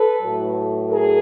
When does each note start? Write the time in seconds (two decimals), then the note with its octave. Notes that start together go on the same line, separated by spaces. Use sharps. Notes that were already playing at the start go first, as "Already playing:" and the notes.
Already playing: A4 B4
0.20 A2 F#3 A3
0.90 G#4 A#4